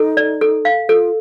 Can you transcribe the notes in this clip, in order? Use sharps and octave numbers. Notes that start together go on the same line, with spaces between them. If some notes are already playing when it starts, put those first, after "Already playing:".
Already playing: D#4 A4
D5
A4
F5
F4 A4